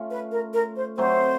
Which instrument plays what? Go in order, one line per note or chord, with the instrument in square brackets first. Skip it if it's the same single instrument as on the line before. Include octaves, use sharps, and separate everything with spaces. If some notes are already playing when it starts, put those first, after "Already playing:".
Already playing: [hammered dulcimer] A3 C#4 F4
[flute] B4
A#4
A#4
C5
[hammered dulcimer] F#3 A3 C4 [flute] C5